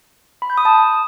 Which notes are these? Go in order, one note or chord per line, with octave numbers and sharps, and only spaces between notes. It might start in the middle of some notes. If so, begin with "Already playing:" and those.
B5
G6
D#6
A5